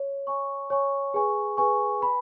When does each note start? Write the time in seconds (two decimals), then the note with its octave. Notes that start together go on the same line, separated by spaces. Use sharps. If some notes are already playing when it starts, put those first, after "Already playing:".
Already playing: C#5
0.27 C#5 G#5 C#6
0.70 C#5 G#5 C#6
1.14 G#4 B4 G#5 C#6
1.57 G#4 B4 G#5 C#6
2.01 B4 G#5 B5